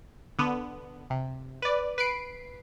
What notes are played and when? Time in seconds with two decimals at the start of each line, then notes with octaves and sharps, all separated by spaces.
0.39 D3 B3
1.10 C3
1.62 B4 D5
1.98 B4 C7 D7